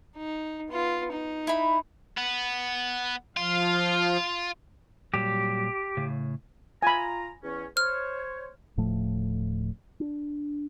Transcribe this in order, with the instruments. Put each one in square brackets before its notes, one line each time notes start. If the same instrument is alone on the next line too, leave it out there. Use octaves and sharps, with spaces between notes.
[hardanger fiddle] D#4
B3 F4
D#4
[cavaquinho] E4 B5
[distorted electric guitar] B3
[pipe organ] F3 F5 [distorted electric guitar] F4
[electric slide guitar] A#2 F#3 G3 [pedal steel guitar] G4
[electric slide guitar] A2 C#3
[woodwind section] F4 A#5 [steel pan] G#5 B5
[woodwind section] E2 C#4
[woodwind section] C5 C#5 [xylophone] F6
[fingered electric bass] D1 A2 F3 A3
D4